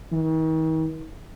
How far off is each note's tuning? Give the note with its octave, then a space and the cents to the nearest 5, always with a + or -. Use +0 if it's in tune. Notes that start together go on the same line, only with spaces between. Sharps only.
D#3 +45